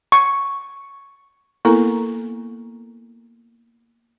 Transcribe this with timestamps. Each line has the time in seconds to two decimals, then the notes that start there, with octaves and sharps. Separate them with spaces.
0.12 C#6
1.65 A#3 B3 E4 A4 A#4 A#5